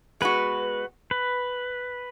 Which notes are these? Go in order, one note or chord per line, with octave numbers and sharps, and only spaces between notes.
G#3 B3 F#4 B4
B4